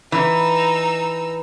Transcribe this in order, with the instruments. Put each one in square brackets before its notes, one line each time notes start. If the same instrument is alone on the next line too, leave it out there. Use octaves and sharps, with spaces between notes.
[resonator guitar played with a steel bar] E3 [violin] D#4 E6